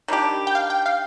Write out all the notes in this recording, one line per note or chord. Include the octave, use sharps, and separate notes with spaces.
D#3 G3 D4 G4
G5
F5
G5
F5